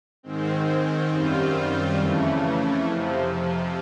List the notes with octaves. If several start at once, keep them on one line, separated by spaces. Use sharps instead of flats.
G#2 D#3 G#3 C4
F#2 D#3 G3 C4 F4
F2 C#3 E3 A3
F2 C3 F3